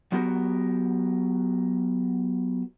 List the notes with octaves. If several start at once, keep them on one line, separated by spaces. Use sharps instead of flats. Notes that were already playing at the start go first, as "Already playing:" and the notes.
F#3 B3 F#4 G4 A#4